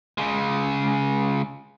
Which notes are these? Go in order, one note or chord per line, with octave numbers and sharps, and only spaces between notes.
C#3 G#3